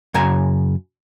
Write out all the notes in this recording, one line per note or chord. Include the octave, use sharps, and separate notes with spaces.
F#2 C#3 G#5 A#5